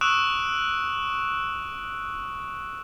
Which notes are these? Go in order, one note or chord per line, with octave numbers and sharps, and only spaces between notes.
C#6 D#6 E6 F#6 D7 E7